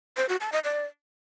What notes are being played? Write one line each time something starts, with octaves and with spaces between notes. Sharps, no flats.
C5
F#4
A5
D#5
D5